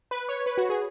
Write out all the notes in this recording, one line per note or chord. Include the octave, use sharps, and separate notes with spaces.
B4
C#5
B4
F#4
G#4